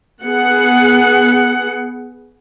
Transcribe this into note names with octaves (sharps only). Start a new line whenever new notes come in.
B3 G#4 F#5